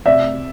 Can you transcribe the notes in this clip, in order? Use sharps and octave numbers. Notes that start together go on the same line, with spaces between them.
C3 D5 E5